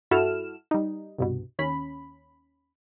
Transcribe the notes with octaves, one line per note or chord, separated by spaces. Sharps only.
G2 E4 F#4 A4 F6 E7
G3 D#4
C2 G2 B2
D#2 C#4 B5